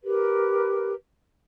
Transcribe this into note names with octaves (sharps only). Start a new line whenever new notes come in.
G4 A#4 B4